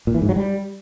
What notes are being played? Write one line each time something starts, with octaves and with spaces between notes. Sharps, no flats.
A#2
E3
G#2
F#3
G3